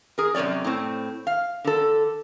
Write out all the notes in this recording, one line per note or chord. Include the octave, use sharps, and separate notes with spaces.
G#4 A#4
F#2 C3 C#4 C#5 D5
A2 C4
F5
D3 A4